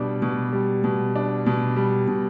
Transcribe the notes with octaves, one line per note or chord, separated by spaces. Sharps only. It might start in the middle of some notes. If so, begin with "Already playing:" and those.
Already playing: B2 G3 D4
B2
G3
B2
D4
B2
G3
B2